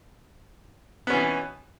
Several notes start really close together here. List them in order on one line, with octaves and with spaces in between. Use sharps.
B3 C#4 E3 B2